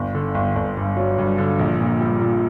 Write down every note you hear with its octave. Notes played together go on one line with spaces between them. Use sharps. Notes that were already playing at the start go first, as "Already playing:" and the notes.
Already playing: G1
D3
G1
G1
G2
F#3
G2
D3
A#1
A#2
G3
A#2